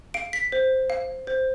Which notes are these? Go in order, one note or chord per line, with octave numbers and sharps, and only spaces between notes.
F5 D7
B6
C5
F5
C5